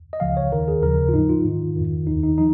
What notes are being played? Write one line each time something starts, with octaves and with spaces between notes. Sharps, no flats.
D#5
C#2 C#3 F3 F5
C#5
D#2 D#3 A#4
G#4
D#2 C#3 F3 A#4
F4
G#2 F3 D#4
F4
G#2 D#3
F2 D#3
D#2 D#3 D#4
D#4
F3 D#4